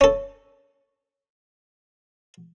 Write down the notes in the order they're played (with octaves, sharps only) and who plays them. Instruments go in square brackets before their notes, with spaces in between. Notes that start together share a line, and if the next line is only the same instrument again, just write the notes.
[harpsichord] C#4 A4